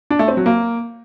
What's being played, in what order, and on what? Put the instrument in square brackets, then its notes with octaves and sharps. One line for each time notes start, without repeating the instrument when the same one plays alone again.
[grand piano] D4
A3
C4
F#3
A#3